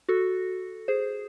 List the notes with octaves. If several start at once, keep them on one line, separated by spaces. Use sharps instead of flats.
F#4 A4
G#4 C5